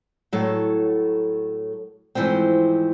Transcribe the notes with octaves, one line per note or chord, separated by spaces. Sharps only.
A2 F#3 A4 C#5
G#2 E3 F3 A3 C4